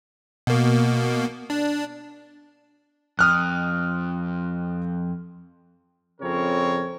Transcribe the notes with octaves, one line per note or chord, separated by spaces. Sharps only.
B2 A#3
D4
F2 D#6 F6 F#6
F2 C#3 C4 A#4 C#5